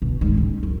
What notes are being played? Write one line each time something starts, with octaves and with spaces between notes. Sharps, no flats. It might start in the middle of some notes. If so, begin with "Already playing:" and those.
B2
G#2 D#3
D#2 C#4
F#2